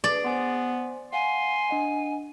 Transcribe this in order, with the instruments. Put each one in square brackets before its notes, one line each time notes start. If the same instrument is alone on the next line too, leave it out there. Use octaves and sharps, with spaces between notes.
[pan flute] G#4 [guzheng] D5
[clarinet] B3 [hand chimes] C5 G#5 C6
[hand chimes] F5 F#5 [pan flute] G#5 [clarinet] C6
[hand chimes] D4 D#5 F#5